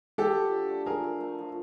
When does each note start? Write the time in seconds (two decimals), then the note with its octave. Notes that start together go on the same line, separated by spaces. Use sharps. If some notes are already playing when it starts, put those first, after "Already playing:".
0.18 F#4 G4 A4
0.36 F3
0.52 D4
0.70 A3
0.86 F3 G#4 A#4
1.04 A3
1.20 A3
1.39 F3